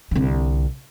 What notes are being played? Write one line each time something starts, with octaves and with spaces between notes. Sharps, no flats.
C2 D3